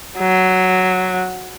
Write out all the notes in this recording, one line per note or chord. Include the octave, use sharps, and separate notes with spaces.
F#3